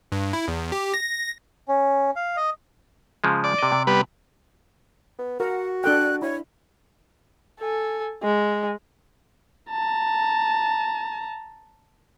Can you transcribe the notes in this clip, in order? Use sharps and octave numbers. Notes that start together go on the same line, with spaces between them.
G2
E4
E2
G4
A#6
C#4
F5
D#5
C#3 F3 G#3
D5
C3 D#5
C3
G3 B3 B4
B3
F#4 A#4 F#5
D4 A4 G5 F#6
E4 C#5
A4 G#5
G#3
A5 A#5